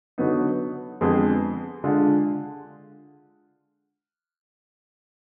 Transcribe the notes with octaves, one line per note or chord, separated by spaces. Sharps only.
D3 F#3 B3 D#4
F2 D3 G#3 B3
D3 G#3 D4 F4